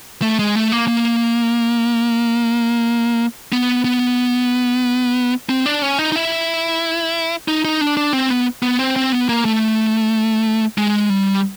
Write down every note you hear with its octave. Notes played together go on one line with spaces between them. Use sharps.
A3
G#3
A3
A#3
A#3
B3
B3
C4
D4
C#4
D#4
D#4
E4
D#4
D#4
D4
D4
C4
B3
B3
C4
C4
B3
A#3
A3
G#3
G3